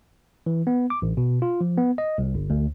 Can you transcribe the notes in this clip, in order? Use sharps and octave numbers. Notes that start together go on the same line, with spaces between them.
E3
B3
D6
A1
B2
F4
F3
B3
D#5
C2
G1
D2